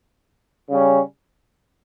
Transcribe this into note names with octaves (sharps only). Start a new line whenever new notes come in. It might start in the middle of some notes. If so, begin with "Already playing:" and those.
C#3 G3 C#4